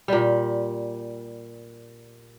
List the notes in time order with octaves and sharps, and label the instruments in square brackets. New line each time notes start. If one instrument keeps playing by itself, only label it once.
[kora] A#2 G3